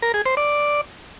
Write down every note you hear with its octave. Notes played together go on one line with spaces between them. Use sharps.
A#4
G#4
C5
D5